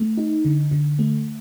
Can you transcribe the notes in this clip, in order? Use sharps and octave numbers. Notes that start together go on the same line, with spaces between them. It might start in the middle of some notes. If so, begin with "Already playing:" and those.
Already playing: A3
D#4
D3
D3
A3